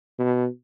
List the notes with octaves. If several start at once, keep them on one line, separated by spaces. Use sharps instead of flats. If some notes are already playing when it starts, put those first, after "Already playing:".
B2